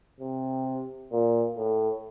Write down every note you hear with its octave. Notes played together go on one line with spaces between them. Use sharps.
C3
A#2
A2